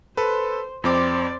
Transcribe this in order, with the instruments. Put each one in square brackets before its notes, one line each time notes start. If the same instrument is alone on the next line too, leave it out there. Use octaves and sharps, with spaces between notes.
[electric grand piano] A4 B4 [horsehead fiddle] C5
[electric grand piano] F2 C4 D6 [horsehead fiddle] C5 D5